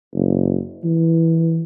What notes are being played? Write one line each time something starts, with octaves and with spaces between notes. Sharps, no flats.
F#1
E3